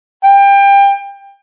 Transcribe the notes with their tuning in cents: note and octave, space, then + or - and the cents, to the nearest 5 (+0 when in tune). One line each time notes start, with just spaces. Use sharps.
G5 +25